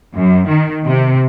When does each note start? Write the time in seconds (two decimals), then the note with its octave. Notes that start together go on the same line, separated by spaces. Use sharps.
0.16 F#2
0.47 D#3
0.86 C3